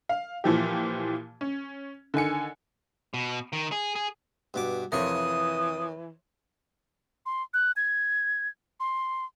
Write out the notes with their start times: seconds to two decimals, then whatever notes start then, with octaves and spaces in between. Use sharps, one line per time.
0.09 F5
0.44 A#2 E3 F3 G4
1.41 C#4
2.14 D3 D#3 G#5 C#7
3.14 B2
3.53 D#3
3.72 G#4
3.95 G#4
4.54 G2 B2 D6
4.92 F2 C3 E3 A#4 C#5 D#6
7.26 C6
7.54 F#6
7.77 G#6
8.80 C6